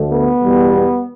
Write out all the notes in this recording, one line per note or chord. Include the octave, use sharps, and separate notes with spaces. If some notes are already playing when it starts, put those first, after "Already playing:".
Already playing: D2 D3 A3
B3
E2 B2 G3